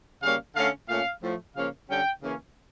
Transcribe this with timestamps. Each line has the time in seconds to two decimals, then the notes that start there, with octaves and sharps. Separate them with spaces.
0.23 C#3 G3 A#3 C#4 F5
0.56 D3 A3 C#4 F5
0.89 A#2 A3 C#4 F5
1.23 A2 F3 A3
1.56 C#3 F3 A#3 C#4 F5
1.89 D3 G3 C#4 G5
2.23 C#3 E3 A#3 C#4